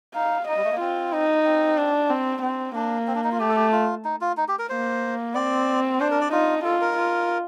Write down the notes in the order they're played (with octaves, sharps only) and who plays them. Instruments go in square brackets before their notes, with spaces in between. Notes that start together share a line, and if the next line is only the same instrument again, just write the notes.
[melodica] D#4 [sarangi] F5
[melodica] D#4 [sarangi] D#5
[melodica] G3
A3
A#3
[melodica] C4 [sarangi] F4
[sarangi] D#4
[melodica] C4
[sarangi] D4
C4
C4
[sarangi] A#3 [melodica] D4
[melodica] C4
D4
D#4
F4
[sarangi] A3 [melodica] G4
[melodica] A4
G4
F4
D#4
F4
D#4
G4
A#4
[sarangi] A#3 [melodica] C5
[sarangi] C4 [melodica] D5
[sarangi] D4 [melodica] C5
[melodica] A#4
D5
[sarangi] D#4 [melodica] F4
[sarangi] F4 [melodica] A4
[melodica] A#4
[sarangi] F4